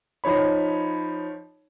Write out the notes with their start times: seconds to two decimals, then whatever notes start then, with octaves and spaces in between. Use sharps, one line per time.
0.24 F3 D#4 C#5 B5